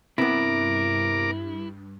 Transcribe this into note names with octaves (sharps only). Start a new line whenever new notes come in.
G2 C3 B3 E4 A#4 D6